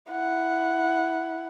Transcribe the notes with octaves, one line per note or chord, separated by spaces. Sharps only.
E4 F#5